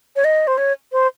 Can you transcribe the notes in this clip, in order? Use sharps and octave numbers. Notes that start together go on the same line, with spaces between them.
C#5
D#5
C5
C#5
C5